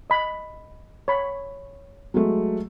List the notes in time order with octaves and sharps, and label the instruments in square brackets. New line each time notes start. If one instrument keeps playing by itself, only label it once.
[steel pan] D#5 B5
C#5 B5
[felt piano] F#3 G#3 A3